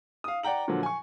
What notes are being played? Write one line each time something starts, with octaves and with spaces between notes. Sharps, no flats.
F5 D#6
D5 F#5 G5 A#5 F#7
A#2 D3 F3 F#3
G#5 C#6